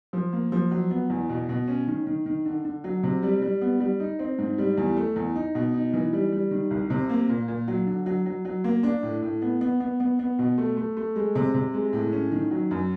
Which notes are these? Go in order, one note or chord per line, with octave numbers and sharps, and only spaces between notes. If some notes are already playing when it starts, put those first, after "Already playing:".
F3
A#3
F3
F#3
B3
E2
B2
B2
C#4
D#3
D#3
D#3
D3
D3
F#3
C3
G3
G3
B3
G3
D#4
C4
G#2
G3
E2
A3
E2
D#4
B2
D#4
E3
G3
G3
D#3
C2
C3
A#3
A#2
A#2
F#3
D3
F#3
F#3
F#3
A#3
D4
A2
A2
B3
B3
B3
B3
B3
B2
A3
A3
A3
G#3
C3
C3
G#3
A2
C#4
D#3
F#3
F#2